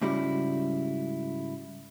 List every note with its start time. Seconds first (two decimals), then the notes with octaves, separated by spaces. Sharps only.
0.01 G#2 C#3 G3 E4 F#4 G4